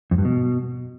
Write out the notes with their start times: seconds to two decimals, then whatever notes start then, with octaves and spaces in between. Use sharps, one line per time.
0.11 F2
0.18 G2
0.25 B2